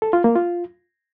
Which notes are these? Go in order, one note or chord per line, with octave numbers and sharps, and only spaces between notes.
A4
F4
A#3
F4